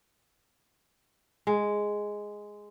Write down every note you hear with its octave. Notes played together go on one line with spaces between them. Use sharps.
G#3